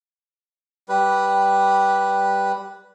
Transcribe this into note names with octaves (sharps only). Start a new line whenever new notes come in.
G3 B4